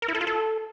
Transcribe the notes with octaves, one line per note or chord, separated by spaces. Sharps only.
A#4
E4
A4
F4
A4